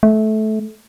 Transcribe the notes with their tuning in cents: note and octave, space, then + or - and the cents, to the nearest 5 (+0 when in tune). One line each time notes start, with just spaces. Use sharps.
A3 -20